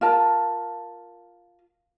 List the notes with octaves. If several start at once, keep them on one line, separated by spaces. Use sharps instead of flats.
F4 A#4 A5